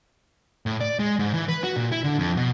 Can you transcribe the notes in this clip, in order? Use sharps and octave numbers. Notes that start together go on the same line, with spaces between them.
A2
D5
G#3
G#2
E3
B4
F#4
A#2
E4
D3
F2
B2